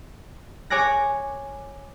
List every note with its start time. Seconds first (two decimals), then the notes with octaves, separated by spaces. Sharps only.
0.70 C#5 G#5 D6 F#6 A#6